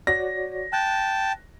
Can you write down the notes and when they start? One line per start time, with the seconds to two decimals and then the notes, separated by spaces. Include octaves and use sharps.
0.07 F#4 C#5 D5 A#6
0.73 G5 A5 F#6